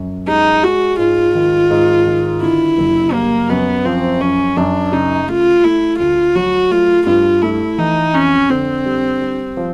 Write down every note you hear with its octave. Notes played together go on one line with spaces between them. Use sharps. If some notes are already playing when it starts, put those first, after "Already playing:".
Already playing: F#2
G#3 D#4
G#3 F#4
G#2 F4
D#3
G#2
D#3
D3 E4
F#1
G3 A#3
F#2 B3
F3 C4
F#2 C#4
F#2 D4
C#3 D#4
A3 F4
A3 E4
D2 F4
F#3 F#4
A3 F4
G2 F4
A3 E4
E3 D#4
F2 C#4
D3 C4
G3
G3
F3